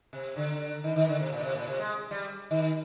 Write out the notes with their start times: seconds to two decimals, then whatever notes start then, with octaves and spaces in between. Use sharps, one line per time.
0.13 C3
0.36 D3
0.84 D#3
0.96 D#3
1.08 D3
1.20 C3
1.32 A#2
1.43 C3
1.55 A#2
1.68 C3
1.79 G#3
2.11 G3
2.51 D#3